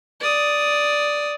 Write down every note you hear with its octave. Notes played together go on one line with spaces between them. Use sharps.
D5 D#6